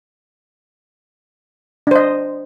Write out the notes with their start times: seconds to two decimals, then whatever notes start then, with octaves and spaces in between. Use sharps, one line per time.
1.87 D4
1.91 C5
1.95 D#5